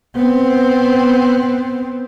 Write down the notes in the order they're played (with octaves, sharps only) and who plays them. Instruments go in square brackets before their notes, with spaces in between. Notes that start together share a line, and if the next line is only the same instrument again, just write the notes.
[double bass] B3 C4